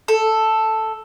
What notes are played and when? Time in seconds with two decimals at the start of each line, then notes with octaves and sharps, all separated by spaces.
0.08 A4